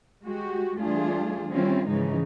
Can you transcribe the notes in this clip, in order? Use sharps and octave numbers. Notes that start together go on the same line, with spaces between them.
G#3 F#4 G4
E3 G3 A3 D4 F4 G#4
D#3 G3 C4 C#4 E4 F4
G#2 C#3 E3 F3 G#3 D#4